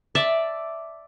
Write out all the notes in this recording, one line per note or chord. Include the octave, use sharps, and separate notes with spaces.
D5 E5 A5